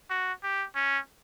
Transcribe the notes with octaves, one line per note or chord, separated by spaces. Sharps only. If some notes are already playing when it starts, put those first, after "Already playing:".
F#4
G4
C#4